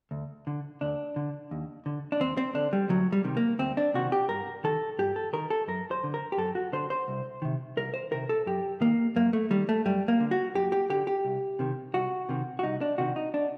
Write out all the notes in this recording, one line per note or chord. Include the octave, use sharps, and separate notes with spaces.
D2
D3
D2 D4
D3
D#2
D3
D4
D#2 C4
C4
D3 D4
G3
D2 F#3
G3
C3 D#3
A#3
D2 C4
D4
C3 D#3 F#4
G4
G2 A#4
D#3 A4
G2 G4
A4
D#3 A#4
A4
F#2 A#4
C5
D3
A#4
G4
F#2 A4
F#4
D3 C5
C5
C2
C3 D#3
C2 A#4
C5
C3 D#3 A#4
A4
F#2 G4
D#3 A#3
F#2 A#3
A3
D#3 G3
A3
F#2 G3
A#3
D3
F#4
F#2 G4
G4
D3 G4
G4
C2
C3 D#3
C2 F#4
C3 D#3
F#4
C2 D#4
D4
C3 D#3 F#4
D#4
D4